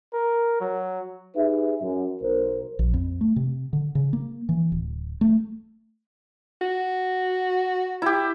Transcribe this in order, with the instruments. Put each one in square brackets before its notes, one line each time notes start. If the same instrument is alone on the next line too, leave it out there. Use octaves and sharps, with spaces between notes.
[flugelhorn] A#4
F#3
[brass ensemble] D#4 G4 G#4 B4 E5
F#2
B1 A#4 C5
[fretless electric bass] A#1
F2
A3
C3
D3
C#3
A#3
E3
D1
A3
[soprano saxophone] F#4
[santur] E4 G4